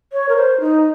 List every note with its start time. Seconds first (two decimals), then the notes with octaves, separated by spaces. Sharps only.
0.13 C#5
0.29 A#4
0.37 C5
0.60 D#4